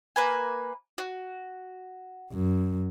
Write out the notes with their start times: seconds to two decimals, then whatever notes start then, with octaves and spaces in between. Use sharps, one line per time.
0.16 A#3 B4 G#5
0.98 F#4
2.33 F#2